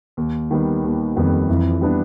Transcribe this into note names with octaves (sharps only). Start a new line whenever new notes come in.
D#2
D#3 G3 B3
D#2
F2 D#3 G3 B3
F2 E3
G3 B3 D4